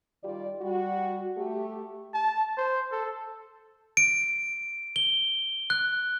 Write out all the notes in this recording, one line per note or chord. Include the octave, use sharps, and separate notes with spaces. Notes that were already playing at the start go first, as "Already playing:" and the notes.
D#3 G3 F4 G4 D5
G3 F#4
A3 G4
A5
C5
A4
D7
G7
F#6